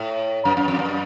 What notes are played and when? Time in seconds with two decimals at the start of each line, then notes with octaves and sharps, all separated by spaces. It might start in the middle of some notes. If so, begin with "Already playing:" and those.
Already playing: A2
0.45 F#2
0.57 F#2
0.68 F2
0.79 F#2